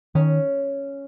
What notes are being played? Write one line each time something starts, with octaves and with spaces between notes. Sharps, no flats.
D#3 C#4